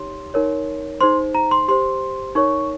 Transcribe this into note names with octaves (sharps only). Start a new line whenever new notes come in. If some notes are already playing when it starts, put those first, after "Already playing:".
Already playing: D#4 G4 C#5 C6
D#4 A#4 C#5
D#4 G#4 C5 C6
A#5
C6
G4 C5 C6
D#4 A#4 C#5 C#6